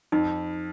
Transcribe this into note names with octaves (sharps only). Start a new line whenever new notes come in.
F2 D#4